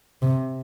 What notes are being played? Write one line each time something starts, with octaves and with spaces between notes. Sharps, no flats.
C3